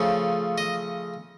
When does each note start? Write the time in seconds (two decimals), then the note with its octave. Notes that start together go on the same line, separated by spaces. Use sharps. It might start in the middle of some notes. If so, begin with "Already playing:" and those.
Already playing: C#3 F3 A3 C#4
0.58 D#5